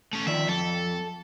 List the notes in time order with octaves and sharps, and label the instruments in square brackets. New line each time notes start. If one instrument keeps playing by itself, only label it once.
[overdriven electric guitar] A3 C#4
[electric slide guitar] D#3 F3 D5 [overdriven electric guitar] E5
[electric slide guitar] F2 [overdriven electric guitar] A4